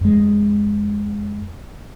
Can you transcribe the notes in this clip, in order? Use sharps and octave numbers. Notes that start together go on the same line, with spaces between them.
F2 G#3